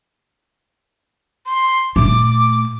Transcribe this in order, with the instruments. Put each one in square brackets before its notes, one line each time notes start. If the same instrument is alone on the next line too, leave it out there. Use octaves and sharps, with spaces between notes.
[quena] C6
[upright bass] A#2 A3 [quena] D6